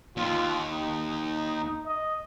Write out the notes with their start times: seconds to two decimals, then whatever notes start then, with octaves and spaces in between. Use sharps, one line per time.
0.17 D#2 F4
0.70 D#4
1.87 D#5